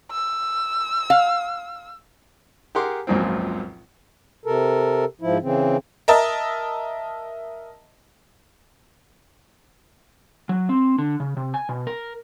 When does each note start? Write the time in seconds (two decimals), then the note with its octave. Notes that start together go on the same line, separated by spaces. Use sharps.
0.12 E6
1.10 F5
2.75 G4 G#4 A#4 F#5 C6 D6
3.07 G#1 C#2 F#2 A#2 F3 C4
4.46 C3 A4 A#4
5.21 G#2 F3 E4
5.42 C#3 E3 C4
6.08 A#4 D#5 E5 A5
10.49 F#3
10.69 C4
10.98 D3
11.20 C#3
11.37 C3
11.54 G#5
11.69 B2
11.87 A#4